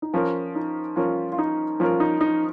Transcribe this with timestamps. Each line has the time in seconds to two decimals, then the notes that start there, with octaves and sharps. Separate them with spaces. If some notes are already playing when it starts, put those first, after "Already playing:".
0.02 D#4
0.13 F3 C#4 F4 A#4
0.55 D#4
0.96 F3 C#4 F4 A#4
1.32 F4
1.38 D#4
1.80 F3 C#4 F4 A#4
2.00 D#4
2.21 D#4